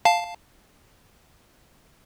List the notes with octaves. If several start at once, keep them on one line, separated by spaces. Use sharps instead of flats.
F5 A5